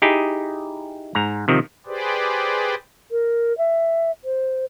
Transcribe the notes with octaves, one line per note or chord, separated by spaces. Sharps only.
D#4 E4 G4 G#4
G#2 A#5
C3 D#3 F3
G4 G#4 B4 C5 D5
A#4
E5
C5